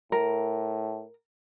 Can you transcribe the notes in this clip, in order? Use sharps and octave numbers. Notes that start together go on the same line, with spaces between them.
A2 A#4